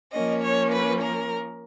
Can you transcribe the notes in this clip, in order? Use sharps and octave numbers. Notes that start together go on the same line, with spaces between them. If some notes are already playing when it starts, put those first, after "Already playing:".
F3 A#3 C#4 D#5
C#5
B4
A#4